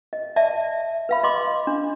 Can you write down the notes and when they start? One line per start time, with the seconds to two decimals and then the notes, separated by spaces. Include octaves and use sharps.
0.13 D#5
0.36 D5 E5 A5
1.09 B4 F5 B5
1.23 D#5 C6 D6
1.67 D4